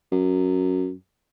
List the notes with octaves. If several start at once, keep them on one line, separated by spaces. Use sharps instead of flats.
F#2